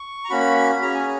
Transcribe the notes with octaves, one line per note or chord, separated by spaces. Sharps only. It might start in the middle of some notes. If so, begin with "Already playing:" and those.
Already playing: C#6
A#5
A#3 C#4 F#4 B5
C#4 G#4 A#5
G#5